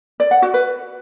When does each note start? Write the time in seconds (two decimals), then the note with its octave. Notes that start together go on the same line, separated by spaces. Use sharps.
0.20 D5
0.31 F#5
0.42 F#4
0.54 B4